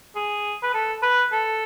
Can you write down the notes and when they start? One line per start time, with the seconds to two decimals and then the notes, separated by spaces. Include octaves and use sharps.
0.16 G#4
0.63 B4
0.74 A4
1.03 B4
1.32 A4